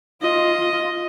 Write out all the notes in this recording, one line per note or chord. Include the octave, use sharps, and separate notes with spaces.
F4 D#5